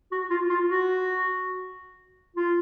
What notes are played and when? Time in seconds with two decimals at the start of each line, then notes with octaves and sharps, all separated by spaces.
0.12 F#4
0.30 F4
0.49 F4
0.69 F#4
2.36 F4